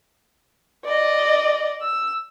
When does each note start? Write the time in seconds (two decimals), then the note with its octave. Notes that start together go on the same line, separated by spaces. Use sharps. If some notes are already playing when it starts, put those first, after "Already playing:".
0.85 D5 D#5
1.81 E6